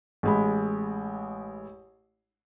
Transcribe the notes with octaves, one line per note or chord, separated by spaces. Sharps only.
A1 G#3 B5